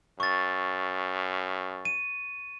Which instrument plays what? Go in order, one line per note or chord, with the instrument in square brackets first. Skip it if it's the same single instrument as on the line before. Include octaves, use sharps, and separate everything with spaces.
[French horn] F#2 [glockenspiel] C#6 A6
[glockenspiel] D#7